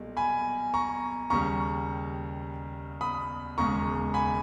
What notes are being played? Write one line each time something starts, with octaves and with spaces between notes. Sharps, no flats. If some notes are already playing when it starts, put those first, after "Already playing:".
Already playing: B1 A#2 G3
G#5 B5
A#5 C#6
D#2 C#3 G3 A#5 C#6
B5 D#6
E1 D#2 C#3 G#3 A#5 C#6
G#5 B5